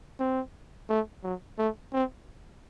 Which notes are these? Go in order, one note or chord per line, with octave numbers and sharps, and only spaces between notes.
C4
A3
F#3
A3
C4